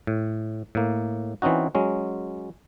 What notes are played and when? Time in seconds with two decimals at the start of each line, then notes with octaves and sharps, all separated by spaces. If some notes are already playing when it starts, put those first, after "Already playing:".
0.07 A2
0.75 A2 A#3
1.42 E3 C4 C#4 D#4 F#4
1.75 F#3 G#3 C#4